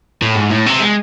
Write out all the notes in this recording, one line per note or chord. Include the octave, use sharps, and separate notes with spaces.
A2
G#2
A2
C3
G#3